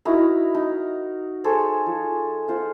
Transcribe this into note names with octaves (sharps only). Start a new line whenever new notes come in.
D#4 E4 F#4 A#4
D#4
G#4 A4 C5 C#5
F3
F4 C5 F#5